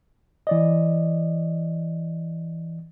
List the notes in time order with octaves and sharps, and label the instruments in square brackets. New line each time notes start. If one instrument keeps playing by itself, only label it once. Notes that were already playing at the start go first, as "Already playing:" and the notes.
[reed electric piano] E3 D5 D#5